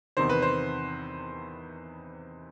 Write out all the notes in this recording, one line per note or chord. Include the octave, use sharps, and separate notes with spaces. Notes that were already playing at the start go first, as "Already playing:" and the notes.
E2 C3 D#3 C5
B4
C5